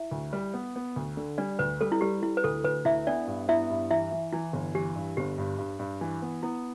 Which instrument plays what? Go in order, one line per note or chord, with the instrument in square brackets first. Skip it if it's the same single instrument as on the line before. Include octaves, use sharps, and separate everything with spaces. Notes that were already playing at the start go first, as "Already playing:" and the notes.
Already playing: [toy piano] E4 E5
[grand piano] D2
G3
B3
B3
D2
D3
[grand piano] G3 [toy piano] D4 D5
[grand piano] D2 [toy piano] B4
[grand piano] G3 [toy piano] A4
[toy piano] E4
[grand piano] G3 [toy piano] G4
[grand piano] G3 [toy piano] E4
[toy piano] B4
[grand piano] D2 [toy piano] A4
[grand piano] D2 [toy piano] B4
[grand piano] D2 [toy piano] E4 E5
[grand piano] B3 [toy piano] D4 D5
[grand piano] G2
[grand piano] B3 [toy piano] E4 E5
[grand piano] G2
[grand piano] E3 [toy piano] E4 E5
[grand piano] E3
[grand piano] E3 [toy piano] E4
[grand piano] G1
[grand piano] E3 [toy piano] G4
[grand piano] G2
[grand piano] G1 [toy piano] G4
[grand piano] G2
G2
G2
E3
B3
[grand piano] B3 [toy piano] E4